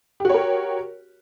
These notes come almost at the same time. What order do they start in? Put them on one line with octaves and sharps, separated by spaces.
G4 F#4 C#5 A#4